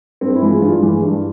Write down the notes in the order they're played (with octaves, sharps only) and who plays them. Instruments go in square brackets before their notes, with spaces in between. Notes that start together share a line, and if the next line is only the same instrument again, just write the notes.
[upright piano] G2 C4
E4
E3 G#3
F4
G2 F4
E3 G#3
G2